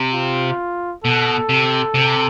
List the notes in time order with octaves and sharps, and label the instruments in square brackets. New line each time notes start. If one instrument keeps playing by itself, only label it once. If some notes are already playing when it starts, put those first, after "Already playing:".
Already playing: [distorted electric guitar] C3
[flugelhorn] F4
[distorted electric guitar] B2 [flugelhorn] A4
[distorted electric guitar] C3
C3